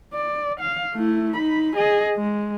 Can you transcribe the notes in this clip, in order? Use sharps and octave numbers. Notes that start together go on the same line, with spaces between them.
D5
F5
A3 E4
D#4 B5
G#4 D#5
G#3